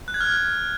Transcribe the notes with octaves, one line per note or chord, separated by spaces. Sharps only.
F#6
G#6
F6